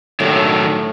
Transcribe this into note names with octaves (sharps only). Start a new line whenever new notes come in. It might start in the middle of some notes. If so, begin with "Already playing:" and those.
A2 D3 D#3 F#3